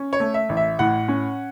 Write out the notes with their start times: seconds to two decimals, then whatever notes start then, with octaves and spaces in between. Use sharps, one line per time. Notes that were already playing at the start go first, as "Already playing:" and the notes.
Already playing: C#4
0.13 C#5
0.20 A3
0.34 E5
0.49 A1
0.57 E5
0.79 A2 F#5
1.08 C#4